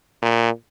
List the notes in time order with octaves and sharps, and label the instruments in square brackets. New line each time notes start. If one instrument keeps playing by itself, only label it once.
[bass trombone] A#2